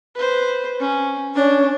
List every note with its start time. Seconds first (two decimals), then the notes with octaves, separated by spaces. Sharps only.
0.15 B4 C5
0.80 C#4
1.35 C#4 D4